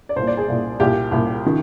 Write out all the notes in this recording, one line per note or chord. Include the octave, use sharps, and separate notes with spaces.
D5
C2 A#2 C5
D5
G#4
C2 A#2
C2 A#2 G4
C2 A#2
D#3